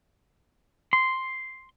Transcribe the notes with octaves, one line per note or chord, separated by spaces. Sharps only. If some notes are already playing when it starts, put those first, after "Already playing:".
C6